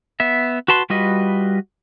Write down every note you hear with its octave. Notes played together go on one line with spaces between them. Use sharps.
B3 E5
F#4 B4 A5 C6
G3 F4 F#4 B4 D#5